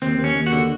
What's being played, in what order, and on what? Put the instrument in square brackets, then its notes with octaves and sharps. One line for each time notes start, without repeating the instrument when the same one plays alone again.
[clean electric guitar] D#2 C4
D#2
C#4
D#2
F#4
D3